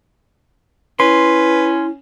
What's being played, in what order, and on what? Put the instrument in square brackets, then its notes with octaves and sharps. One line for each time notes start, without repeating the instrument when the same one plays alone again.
[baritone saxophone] C#4 [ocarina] E4 [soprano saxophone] B4 [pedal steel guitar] C6